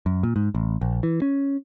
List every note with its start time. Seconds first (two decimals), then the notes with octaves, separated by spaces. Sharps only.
0.06 F#2
0.23 A#2
0.36 G#2
0.55 A1
0.81 A#1
1.03 E3
1.22 C#4